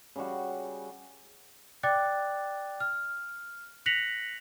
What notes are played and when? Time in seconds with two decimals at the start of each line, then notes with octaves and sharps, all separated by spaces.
0.16 C#3 G3 F#4
1.83 D5 G5 D6 F#6 A6
2.80 F6
3.86 F#6 A#6 B6 C#7 F7 F#7